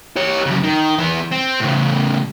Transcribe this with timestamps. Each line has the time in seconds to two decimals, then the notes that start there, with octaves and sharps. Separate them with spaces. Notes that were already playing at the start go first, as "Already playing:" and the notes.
0.17 G4 C#5
0.46 F#2 C#3
0.63 D#3
0.98 E3 B3
1.32 C4
1.61 A2 C#3